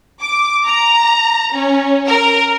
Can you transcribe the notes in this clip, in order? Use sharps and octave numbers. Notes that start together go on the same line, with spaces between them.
D6
A#5
C#4
A#4